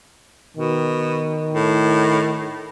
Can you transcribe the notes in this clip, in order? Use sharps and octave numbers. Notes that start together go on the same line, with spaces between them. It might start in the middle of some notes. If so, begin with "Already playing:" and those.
B2 D#3
A2